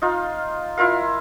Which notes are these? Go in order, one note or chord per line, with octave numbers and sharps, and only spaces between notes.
D#4 F4 F5
E4 F4 A#4 F5